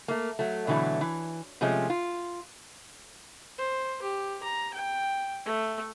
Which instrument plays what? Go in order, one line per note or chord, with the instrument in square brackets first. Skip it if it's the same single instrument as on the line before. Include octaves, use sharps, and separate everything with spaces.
[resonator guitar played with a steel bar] A3 A#3
F#3 A3
B2 D3 E3 F#3 A3
E3
C3 F3 G#3 A3 C#4
F4
[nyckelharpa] C5
G4
A#5
G5
A3